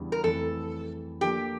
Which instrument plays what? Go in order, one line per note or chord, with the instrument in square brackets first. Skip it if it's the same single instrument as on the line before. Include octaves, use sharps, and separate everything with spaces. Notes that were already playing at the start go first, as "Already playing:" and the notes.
Already playing: [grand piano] E2 C#3 E3 G3 D4
[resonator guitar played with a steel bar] A#4
[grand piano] F2 E3 A3 [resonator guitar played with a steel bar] A4
[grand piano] F3 A#3 D4 A4 [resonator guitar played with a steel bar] G4